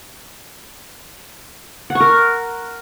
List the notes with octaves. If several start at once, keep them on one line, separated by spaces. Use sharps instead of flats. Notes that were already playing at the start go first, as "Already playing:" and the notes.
F#5
C#6
A#4